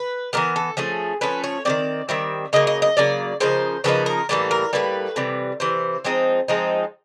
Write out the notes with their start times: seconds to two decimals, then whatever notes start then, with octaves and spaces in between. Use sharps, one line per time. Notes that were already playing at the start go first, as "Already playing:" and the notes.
Already playing: B4
0.33 E3 G3 B3 A#4
0.56 A4
0.77 F3 A3 C#4 G#4
1.21 F3 A3 C#4 B4
1.44 C#5
1.65 D#3 G3 C4 D5
2.09 D#3 G3 C4 E5
2.53 C#3 F#3 A#3 D#5
2.67 D#5
2.82 D#5
2.97 C#3 F#3 A#3 D5
3.40 C#3 F3 A#3 D#4 C5
3.84 C#3 F3 A#3 D#4 B4
4.06 A#4
4.29 A2 E3 G3 A#3 A4
4.51 A#4
4.73 A2 E3 G3 A#3 B4
5.16 C3 E3 G3
5.60 C3 E3 C5
6.04 F3 G#3 C4 D#4
6.48 F3 G#3 C4 D#4